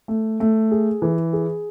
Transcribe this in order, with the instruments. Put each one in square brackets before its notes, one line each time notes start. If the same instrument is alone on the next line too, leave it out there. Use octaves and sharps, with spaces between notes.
[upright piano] A3
A3
G#4
E3
G#4